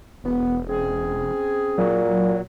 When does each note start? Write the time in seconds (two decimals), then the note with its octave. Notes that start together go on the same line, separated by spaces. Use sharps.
0.24 E1 B3
0.69 C4 C#4 G#4
1.78 A#2 F#3